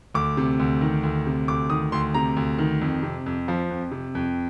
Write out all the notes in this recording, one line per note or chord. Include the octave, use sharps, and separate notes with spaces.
D2 D6
C3
D2
D#3
D2
C3
D2 D6
D#3 D#6
D2 C6
C3 A#5
D2
D#3
F2
C3
F2
F3
F2
C3
F2